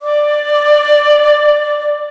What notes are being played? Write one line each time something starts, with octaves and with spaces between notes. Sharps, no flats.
D5 D6